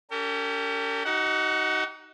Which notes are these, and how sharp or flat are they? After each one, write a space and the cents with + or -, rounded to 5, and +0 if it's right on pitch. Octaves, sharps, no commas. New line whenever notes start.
C#4 +45 G4 +0 A#4 -45
D#4 +10 F#4 +45 F#5 +0